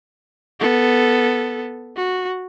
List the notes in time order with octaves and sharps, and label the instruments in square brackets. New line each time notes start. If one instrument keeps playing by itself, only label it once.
[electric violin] B3 A4
F#4